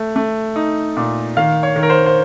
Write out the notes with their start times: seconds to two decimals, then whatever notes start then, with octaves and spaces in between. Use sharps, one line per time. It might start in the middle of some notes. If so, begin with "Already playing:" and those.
Already playing: A3
0.16 A3
0.56 D#4
0.97 A#2
1.37 D#3 F5
1.63 C#5
1.76 D#3
1.83 A#4
1.90 C5
2.06 C5